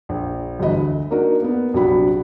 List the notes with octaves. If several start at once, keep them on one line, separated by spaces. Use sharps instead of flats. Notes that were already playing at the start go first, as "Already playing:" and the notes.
A#1
G1 E3 F#4 D#5 B5
D2
A#3 D4 D#4 F#4 A#4
A#3 B3
A#1 C3 F#3 D4 F#4 B5